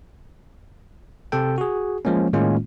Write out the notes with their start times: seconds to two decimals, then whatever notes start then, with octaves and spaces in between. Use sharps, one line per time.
1.32 C3 C4 A4 G5
1.58 F#4 G#4
2.05 F3 G#3 A#3 C#4
2.33 A2 D#3 G#3 A#3 C#4 F4